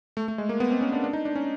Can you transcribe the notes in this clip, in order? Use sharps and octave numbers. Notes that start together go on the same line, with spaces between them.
A3
A3
G#3
A#3
B3
C4
C#4
D4
D4
D#4
D4
C#4